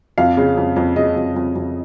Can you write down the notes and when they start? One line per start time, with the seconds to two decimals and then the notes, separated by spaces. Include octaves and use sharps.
0.18 F2 F5
0.37 C#3
0.57 F2
0.76 F2
0.96 C#3 D#5
1.16 F2
1.36 F2
1.55 F2